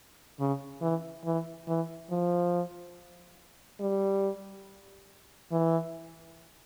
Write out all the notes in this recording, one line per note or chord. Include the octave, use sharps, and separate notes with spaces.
C#3
E3
E3
E3
F3
G3
E3